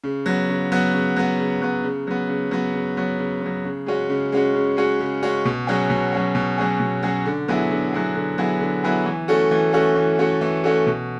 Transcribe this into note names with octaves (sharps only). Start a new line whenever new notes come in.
C#3
F#3 B3
C#3
F#3 B3
C#3
F#3 B3
C#3
F#3 B3
C#3
F#3 B3
C#3
F#3 B3
C#3
F#3 B3
C#3
F#3 B3
C#3
G#3 C#4 F#4
C#3
G#3 C#4 F#4
C#3
G#3 C#4 F#4
C#3
G#3 C#4 F#4
B2
F#3 C#4 G#4
B2
F#3 C#4 G#4
B2
F#3 C#4 G#4
B2
F#3 C#4 G#4
D3
F#3 B3 E4 G#4
D3
F#3 B3 E4 G#4
D3
F#3 B3 E4 G#4
D3
F#3 B3 E4 G#4
E3
A3 C#4 F#4 A4
E3
A3 C#4 F#4 A4
E3
A3 C#4 F#4 A4
E3
A3 C#4 F#4 A4
B2